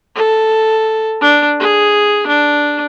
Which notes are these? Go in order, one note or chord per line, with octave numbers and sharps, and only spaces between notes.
A4
D4
G#4
D4